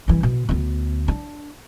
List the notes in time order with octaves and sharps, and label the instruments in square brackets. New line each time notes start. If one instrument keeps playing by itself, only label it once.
[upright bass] C2 E3
B2
D2 B3
D4